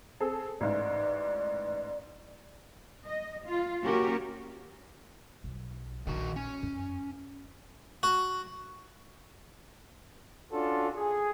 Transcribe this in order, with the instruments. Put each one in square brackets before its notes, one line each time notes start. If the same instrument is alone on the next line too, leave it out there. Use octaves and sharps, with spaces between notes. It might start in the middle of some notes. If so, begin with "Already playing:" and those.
[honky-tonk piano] C4 G#4 A4
[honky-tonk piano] A1 G#2 [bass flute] D5
[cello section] D#5
F4
A#3 C#4 F#4 G4 A#4
[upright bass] B1
[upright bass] A#1 D#4 [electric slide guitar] D#3 F#4
[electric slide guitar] C#4
[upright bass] F#2
[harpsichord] F#4
[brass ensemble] C#4 D4 F4 F#4 A4
G#4